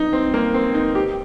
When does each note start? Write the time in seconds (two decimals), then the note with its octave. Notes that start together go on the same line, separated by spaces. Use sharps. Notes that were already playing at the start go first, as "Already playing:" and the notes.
Already playing: D#4
0.13 C4
0.34 A#3
0.54 C4
0.74 D#4
0.95 G4